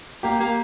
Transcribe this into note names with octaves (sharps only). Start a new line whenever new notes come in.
A#3 G4
A#3